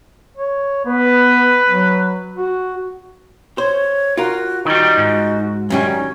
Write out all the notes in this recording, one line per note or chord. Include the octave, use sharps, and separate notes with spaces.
C#5
B3 B4
F#3
F#4
C5 C#5
F4 F#4 A#4
D#3 G3 D#4 F#4
G#2
F#2 D#3 G3 C#4